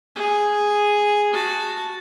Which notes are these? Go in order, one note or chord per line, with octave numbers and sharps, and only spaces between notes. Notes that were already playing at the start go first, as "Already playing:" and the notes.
G#4
F#4 A5